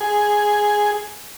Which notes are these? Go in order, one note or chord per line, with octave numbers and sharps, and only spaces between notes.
G#4